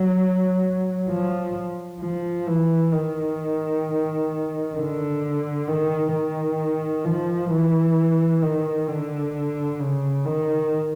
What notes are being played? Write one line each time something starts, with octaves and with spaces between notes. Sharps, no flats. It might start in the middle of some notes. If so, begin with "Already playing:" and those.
Already playing: F#3
F3
F3
E3
D#3
D3
D#3
D#3
F3
E3
D#3
D3
C#3
D#3